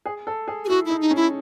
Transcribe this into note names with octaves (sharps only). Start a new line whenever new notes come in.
G#4
A4
G#4
G#4
E4 F#4
D#4 E4
D#4
C#4
E4